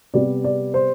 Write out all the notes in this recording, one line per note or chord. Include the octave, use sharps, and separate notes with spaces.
C3 G3 B3 D5
D5
C5